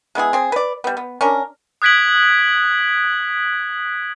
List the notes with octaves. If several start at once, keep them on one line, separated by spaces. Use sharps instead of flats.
G#3 B3 E4 G#4
C4 G#4
B4 D5
G3 B3
B3
C#4 D4 A#4
D#6 F#6 G#6 B6 D7 F#7